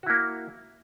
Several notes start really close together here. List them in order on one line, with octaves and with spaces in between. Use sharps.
F#4 E4 A#3